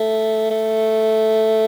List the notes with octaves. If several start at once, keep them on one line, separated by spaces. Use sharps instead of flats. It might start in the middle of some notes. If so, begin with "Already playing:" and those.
Already playing: A3
A3